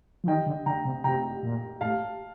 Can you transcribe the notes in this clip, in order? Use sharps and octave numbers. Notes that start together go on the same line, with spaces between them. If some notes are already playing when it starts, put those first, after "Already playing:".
F3
D#3 D#5 G5
D3
D3 G5 A#5
C3
C3 G5 A#5
A#2
A2 F5 A5